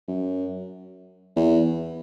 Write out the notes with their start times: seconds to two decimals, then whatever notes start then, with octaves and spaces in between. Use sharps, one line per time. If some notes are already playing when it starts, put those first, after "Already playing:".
0.08 F#2
1.36 E2